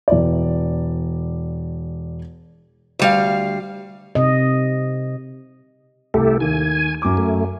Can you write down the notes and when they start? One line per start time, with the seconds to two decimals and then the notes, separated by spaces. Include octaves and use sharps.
0.08 E1 D5
2.99 D2 G3 F5
4.15 C3 D#5
6.14 C2 A3 G4 A4
6.40 D#2 G#5
7.02 F#2 D6
7.17 A3